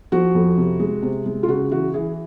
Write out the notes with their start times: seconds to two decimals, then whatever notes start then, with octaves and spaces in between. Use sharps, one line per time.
0.12 F3 F#4
0.35 F2
0.57 C3
0.79 G#3
1.03 C3
1.26 G#3
1.43 F4
1.48 C#3 F#4
1.71 E3 F#4
1.94 E3 G#4